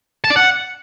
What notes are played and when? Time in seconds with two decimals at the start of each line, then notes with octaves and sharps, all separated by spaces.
0.24 A5
0.30 D5
0.36 F#5